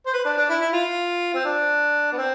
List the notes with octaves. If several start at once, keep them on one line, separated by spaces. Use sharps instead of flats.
C5
B4
D4
D4
E4
E4
F4
C4
D4
B3
C4